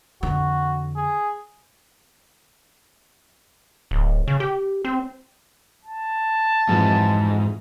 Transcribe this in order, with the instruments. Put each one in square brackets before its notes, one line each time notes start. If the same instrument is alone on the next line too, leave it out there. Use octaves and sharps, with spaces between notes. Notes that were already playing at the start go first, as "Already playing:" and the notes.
[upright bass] F2 D3 [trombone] F#4
[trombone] G#4
[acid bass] D1
C#3
G4
C4
[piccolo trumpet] A5
[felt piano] F2 E3 F#3 [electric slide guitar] G#2